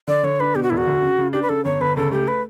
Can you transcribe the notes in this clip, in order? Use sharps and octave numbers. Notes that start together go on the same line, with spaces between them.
D3 D5
D3 C#5
D4 B4
B2 G4
F#4
E1 E4
F#4
D2
C#3
C#3
D4 G4
B4
C#3 A4
G1 C#5
G1 B4
C#2 A4
A3 G4
B4